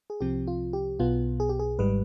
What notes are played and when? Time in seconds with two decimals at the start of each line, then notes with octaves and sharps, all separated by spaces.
0.10 G#4
0.20 C2 C3 F3 C4 G4
0.47 F4
0.73 G4
0.99 B1 B2 B3 F4
1.40 G#4
1.49 G4
1.59 G#4
1.79 G#1 G#2 G3 B4